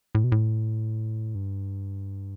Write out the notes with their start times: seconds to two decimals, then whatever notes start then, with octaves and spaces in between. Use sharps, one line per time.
0.15 A2
0.24 B2
0.32 A2
1.35 G2